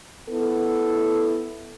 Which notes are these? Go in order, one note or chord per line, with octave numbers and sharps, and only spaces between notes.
B3 E4 A4